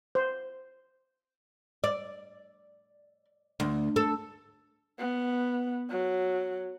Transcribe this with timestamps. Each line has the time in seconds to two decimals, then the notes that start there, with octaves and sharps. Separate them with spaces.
0.15 C5
1.84 D5
3.60 D2
3.96 A4
4.99 B3
5.90 F#3